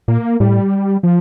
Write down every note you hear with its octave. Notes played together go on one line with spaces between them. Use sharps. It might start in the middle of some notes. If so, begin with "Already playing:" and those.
A#2 A#3
A2 G3
F3